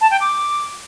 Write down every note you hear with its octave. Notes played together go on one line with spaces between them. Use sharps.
A5
G5
D6